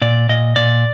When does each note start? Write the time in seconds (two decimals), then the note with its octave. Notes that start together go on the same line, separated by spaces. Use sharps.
0.02 A#2 D5
0.29 A#2 D#5
0.56 A#2 D5